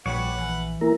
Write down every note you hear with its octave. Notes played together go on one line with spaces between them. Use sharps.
A#1 G3 B4 C#5 F#5
E3
A#3 E4 A#4